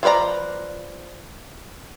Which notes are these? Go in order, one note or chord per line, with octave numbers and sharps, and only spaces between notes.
F3 F4 B4 D5 A#5